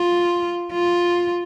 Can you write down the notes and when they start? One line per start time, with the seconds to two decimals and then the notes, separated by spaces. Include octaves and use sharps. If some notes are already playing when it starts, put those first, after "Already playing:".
Already playing: F4
0.72 F4